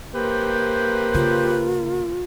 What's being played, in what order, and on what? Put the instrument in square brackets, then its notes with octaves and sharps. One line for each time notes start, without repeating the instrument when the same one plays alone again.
[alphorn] A#3 [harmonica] G4 B4 C5
[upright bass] C#3 [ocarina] F4